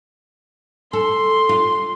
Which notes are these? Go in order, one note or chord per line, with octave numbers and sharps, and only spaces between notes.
A4 C6
F4